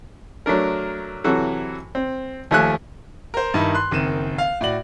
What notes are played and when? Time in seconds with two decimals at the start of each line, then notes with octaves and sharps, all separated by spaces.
0.46 F#3 A3 D4 A#4
1.24 C3 E3 F#3 F#4 A4
1.95 C4
2.51 D#2 F3 A3 A4 G#5 F#6
3.34 A#4 C5
3.54 G2 D#3 D#4 E4
3.74 C6 F#6
3.91 F#1 D#3 C4 D#7 E7
4.38 F5
4.61 A2 F#4 D5 F#7